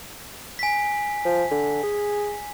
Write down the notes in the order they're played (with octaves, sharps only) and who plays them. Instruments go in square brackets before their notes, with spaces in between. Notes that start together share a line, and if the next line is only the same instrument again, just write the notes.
[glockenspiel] G#5 B6
[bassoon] F3
D3
G#4